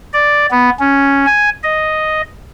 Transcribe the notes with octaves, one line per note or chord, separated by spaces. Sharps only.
D5
B3
C#4
G#5
D#5